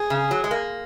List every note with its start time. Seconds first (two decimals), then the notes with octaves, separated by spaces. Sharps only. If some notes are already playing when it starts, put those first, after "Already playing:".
Already playing: G#4
0.10 C#3
0.31 F#3
0.44 G#3
0.51 A#3